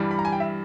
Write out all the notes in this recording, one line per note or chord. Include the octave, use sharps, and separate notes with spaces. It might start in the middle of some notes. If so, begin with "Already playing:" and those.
Already playing: G2 E3 G3
B5
A#5
G#5
G5
E5